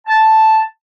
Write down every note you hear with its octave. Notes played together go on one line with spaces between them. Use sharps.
A5